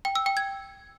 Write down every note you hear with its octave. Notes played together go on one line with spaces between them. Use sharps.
G5
E6
G5
G#6